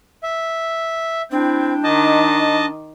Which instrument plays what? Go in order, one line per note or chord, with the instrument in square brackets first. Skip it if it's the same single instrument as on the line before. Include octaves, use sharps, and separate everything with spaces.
[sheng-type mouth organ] E5
[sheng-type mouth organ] C4 [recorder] D4 [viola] E4 G5
[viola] D#3 D6 [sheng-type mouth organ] D#5 A5